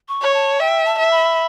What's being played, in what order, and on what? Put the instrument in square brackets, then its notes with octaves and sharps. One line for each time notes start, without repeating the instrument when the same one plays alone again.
[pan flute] C#6
[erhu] C#5
[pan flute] A5
[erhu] E5 [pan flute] G5
[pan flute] A5
[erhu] E5
[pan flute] B5